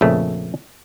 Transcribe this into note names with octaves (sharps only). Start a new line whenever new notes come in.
A#1 F2 C#3 A3